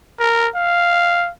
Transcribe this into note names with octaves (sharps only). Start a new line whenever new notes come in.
A#4
F5